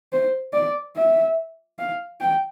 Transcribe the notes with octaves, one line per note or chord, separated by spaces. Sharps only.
C5
D5
E5
F5
G5